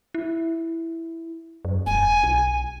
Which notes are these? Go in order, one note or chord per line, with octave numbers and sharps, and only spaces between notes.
E4
F#2
E1 G#5
B1